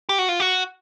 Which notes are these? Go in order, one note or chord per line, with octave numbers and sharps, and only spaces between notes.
G4
F#4
F4
F#4